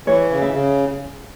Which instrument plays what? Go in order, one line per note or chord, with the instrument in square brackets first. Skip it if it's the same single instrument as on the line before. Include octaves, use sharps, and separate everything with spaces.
[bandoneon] E3 [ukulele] C#5
[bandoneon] C#3
[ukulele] E5
[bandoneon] C#3